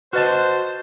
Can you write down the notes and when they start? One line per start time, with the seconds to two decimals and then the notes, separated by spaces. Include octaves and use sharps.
0.13 F#4 B4 C5 D#5 A5